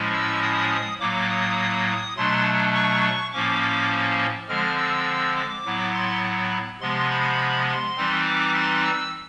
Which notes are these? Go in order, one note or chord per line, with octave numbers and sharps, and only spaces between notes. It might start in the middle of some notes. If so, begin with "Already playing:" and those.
Already playing: A2 F3 G#3 C#4 E4
E6
D#6
A2 F#3 A#3 D6
D#6
D#6
B2 F#3 A3 D4 C6
C#6
A2 F3 A#3 C#4 D6
D6
D3 F3 G#3 C4 F6
E6
D6
A2 F#3 B3 E4
C6
C3 F3 G#3 B3 C6
B5
C6
E3 G3 C4 D#4
D6
C6
E6